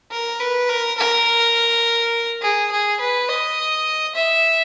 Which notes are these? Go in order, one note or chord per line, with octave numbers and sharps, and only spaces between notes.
A#4
B4
A#4
A#4
G#4
G#4
B4
D#5
E5